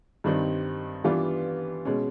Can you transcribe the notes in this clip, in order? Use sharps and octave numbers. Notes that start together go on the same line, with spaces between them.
G2 D#3 G3 C4 D#4
E3 G3 B3 D4 F4
B2 G#3 C#4